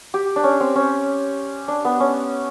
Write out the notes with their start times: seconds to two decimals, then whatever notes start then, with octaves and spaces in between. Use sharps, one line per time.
0.14 G4
0.36 D4
0.44 C#4
0.60 C4
0.76 C#4
1.68 D4
1.85 B3
2.00 C#4